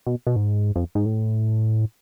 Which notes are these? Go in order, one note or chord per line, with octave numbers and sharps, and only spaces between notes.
B2
B2
G#2
F2
G#2
A2